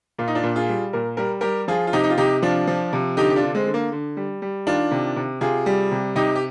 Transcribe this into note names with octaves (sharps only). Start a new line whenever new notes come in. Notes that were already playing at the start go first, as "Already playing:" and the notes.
A#2 F4
D#4
D4 F4
A#2
F4 G#4
G3
A#2 A#4
G3 A#4
G3 G4 A#4
F3 F4 G#4
F4
C3 D#4 G4
D#4
F4
C3 D#4 G4
F3 D4 F4
F3
C3
D3 D#4 G4
G4
D4 F4
D3
G#3 C4
D3
A#3
D3
G3
G3
D#3 D4 F4
C3
C3
C3 F4 G#4
G3
C3
C3 D#4 G4
G4